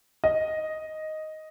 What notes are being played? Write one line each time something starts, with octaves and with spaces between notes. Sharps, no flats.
D#5